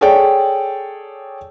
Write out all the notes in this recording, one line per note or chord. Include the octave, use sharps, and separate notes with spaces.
G#4 A4 C#5 D5 G5